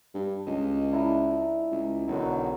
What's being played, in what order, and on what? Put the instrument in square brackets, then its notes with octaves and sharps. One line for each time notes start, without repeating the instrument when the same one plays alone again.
[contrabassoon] G2
[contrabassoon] C#2 [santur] D#5
[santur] D4 E4 A#5
[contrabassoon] C#2
[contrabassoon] B1 [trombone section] D3 D#3 F#3